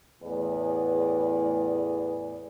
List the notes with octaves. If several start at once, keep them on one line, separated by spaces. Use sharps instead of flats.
E2 A2 G#4 B4 D5